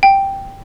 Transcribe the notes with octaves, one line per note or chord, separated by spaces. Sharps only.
G5